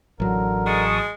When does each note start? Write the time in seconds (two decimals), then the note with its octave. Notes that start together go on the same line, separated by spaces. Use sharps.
0.20 A1 D3 F#3 A#4
0.66 G#3 A5 C#6 D#6